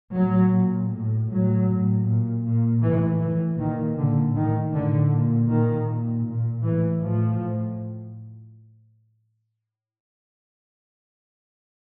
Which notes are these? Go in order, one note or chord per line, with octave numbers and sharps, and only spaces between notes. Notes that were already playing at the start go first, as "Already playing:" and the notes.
A2 F#3
A#2
A2
A2 F#3
A2
A#2
A#2
A2 E3
A2 E3
A#2 D#3
A#2 D3
A2 D#3
A2 D3
A#2
A#2 D#3
A#2
A#2
A2 E3
A2 F3
A2